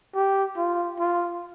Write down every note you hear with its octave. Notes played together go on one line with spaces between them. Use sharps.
G4
F4
F4